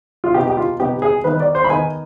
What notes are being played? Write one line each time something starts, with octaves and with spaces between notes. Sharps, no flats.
F4
B2 B3 D#4 G4
G4
F4
B2 B3 D#4 G4
G#4
D#3 B3 D#4 B4
D5
C5
B5
D#3 B3 D#4 G#5